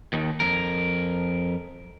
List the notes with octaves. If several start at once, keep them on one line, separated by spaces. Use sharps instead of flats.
D#2 D#3
F2 A#4